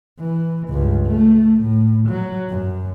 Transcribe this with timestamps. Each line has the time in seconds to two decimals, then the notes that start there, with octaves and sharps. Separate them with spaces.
0.20 E3
0.68 C#2 G2
1.06 A3
1.61 A2
2.08 F#3
2.49 F#2